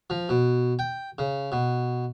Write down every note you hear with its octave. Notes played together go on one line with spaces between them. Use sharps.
F3
B2
G5
C#3
B2